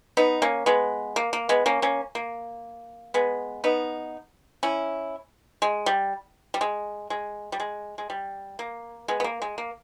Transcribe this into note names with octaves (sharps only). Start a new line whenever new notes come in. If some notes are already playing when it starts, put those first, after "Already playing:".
B3 D#4
A#3 C#4
G#3 B3
A#3
A#3
G#3 B3
A#3 C#4
A#3 C#4
A#3
G#3 B3
B3 D#4
C#4 E4
G#3
G3
G3
G#3
G#3
G3
G#3
G#3
G3
A#3
G#3 B3
B3
A#3
G#3
A#3